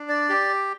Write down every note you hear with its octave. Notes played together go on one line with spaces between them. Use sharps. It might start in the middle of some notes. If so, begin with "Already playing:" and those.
Already playing: D4
D5
G4